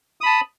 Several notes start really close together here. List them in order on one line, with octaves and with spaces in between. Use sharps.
D#6 B5 A5